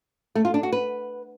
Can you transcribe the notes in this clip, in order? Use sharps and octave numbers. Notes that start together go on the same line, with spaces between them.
A3
F4
D4
F#4
B4